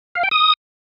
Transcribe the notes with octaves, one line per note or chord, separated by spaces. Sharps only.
F5
G5
D#6